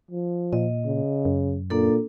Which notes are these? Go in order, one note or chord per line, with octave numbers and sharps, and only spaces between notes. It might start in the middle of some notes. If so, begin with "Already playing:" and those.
F3
A#2 D#5
C#3
F#2
A#2 A#3 D4 A4